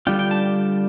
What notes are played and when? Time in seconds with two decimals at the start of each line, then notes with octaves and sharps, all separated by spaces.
0.07 D3 G3 D4 F4 G5
0.19 G5
0.31 A5